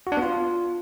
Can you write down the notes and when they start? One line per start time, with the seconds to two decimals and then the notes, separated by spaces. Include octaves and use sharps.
0.07 F#4
0.12 D4
0.17 B3
0.22 F4